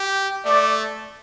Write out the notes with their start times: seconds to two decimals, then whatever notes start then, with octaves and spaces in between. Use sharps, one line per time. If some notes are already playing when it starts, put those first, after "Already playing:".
Already playing: G4
0.45 A3 D5